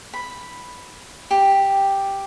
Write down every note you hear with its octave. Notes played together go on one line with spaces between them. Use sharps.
B5
G4